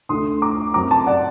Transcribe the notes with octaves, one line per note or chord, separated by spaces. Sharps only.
D2 D3 A3 C6 D#6
A#5 D6
F#2 F#3 C4 A#5 D6
A5 C6
D5 F#5